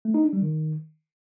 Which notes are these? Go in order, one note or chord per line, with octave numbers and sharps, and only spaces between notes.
A3
D#4
D4
G3
D#3